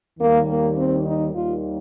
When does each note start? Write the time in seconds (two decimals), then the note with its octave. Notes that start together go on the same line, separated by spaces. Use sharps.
0.20 D#2 D#3 G3 A#3
0.48 A#3
0.77 C4
1.05 D#4
1.34 D#2 D#3 G3 A#3 F4